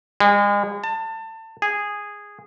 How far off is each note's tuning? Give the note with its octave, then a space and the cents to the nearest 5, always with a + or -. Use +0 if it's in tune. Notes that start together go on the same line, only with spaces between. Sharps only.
G#3 -35
A5 +25
G#4 -10